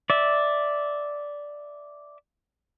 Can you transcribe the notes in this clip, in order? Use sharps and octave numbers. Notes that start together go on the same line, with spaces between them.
D5 E5